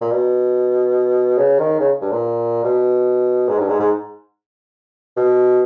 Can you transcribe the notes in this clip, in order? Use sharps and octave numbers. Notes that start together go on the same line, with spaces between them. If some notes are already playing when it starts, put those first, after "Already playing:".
A#2
B2
C#3
D#3
C#3
G2
A#2
B2
G#2
G2
G#2
G#2
B2